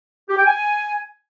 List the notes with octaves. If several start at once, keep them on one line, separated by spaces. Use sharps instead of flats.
G4
G5
G#5